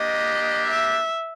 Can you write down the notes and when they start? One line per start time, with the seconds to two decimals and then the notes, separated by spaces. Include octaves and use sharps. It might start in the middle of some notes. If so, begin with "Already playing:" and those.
Already playing: A#3 D4 G4 D#5
0.68 E5